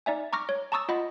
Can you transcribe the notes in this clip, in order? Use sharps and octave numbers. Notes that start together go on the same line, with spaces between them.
D#4 D5 E5 G#5
A#5 C#6 D6 F6 A#6
C#5
A5 A#5 C#6 D#6 E6 A6
F4 D#5 F#5 B5